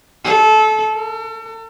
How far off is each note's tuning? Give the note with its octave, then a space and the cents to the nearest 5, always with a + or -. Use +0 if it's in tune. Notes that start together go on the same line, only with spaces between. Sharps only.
A4 -25
A4 +40